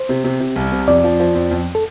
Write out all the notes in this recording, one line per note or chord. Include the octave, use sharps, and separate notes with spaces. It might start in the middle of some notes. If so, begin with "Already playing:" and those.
Already playing: C5
C3
C3
C3
C2
C3
F2 D5
F3
F3
F2
F2
A4